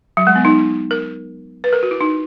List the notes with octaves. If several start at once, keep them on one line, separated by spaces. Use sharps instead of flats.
F#3
G#3
B3
D#4
A#4
B4
A#4
F#4
E4
D#4